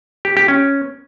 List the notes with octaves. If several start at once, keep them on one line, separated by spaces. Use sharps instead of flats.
G4
G4
C#4